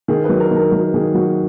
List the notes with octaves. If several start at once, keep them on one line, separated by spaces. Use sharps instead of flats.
D#3 G#4
F#3 B4
A#4
D#3
A#4
F#3 A#4
D#3 G#4
F#3 F#4